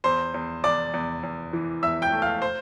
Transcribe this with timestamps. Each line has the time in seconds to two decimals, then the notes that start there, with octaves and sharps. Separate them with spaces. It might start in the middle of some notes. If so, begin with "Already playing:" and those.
0.04 E2 C5 C6
0.34 E2
0.64 E2 D5 D6
0.94 E2
1.23 E2
1.53 E3
1.83 E2 E5 E6
2.02 G5 G6
2.12 A3
2.22 F5 F6
2.42 C5 C6